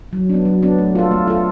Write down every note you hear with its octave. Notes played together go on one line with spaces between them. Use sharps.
F#3
B3 D4
F#3
B3 D4
A3
F4 A4
A3
F4 A4